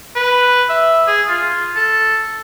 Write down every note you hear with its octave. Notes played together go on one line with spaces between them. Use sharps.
B4
E5
G#4
F4
A4